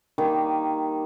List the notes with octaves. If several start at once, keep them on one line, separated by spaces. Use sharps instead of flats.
D#3 G3 A#3